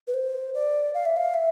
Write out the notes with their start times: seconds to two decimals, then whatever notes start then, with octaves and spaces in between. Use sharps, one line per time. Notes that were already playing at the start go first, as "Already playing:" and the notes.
0.07 B4
0.14 C5
0.54 D5
0.94 F5
1.05 E5
1.16 F5
1.34 E5